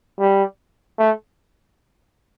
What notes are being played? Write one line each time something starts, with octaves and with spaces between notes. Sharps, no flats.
G3
A3